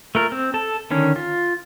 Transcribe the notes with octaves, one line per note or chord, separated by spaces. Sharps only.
A3 F4 A#4
C4
A4 A5
D3 D#3 C#4
F4